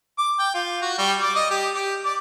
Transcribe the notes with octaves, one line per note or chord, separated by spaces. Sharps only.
D6
G5
F4
F#4
G3
D5
D#5
G4
G4
D5